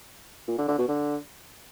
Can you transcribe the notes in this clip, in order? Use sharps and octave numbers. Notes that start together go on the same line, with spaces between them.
A#2
D3
D3
B2
D3